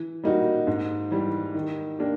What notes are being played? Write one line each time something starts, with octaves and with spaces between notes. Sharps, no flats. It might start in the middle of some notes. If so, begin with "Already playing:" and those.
Already playing: E3
G3 A#3 D#4 F#4
G#2
E3 G3
D#3
A#3 D4 G4